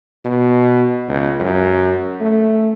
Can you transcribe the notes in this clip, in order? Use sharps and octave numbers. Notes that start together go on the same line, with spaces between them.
B2
C#2
F#2
A3